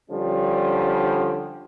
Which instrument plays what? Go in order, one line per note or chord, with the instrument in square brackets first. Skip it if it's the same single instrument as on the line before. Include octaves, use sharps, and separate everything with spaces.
[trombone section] D3 F3 G3 C#4